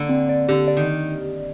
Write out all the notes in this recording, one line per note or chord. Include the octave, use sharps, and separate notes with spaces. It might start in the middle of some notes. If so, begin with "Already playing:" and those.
Already playing: D3 A#3 D5
C4
D5
D3 G4
D5
D#3